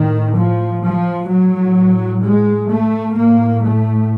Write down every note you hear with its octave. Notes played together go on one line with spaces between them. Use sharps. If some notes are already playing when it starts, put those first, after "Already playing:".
Already playing: A2 D#3
F3
F3
A2 F#3
G#3
A3
A2 A#3
A3